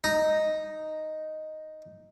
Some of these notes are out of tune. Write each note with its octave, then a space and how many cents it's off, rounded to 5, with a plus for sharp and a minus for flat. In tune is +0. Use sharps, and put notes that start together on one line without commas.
D#4 +0 A#5 +0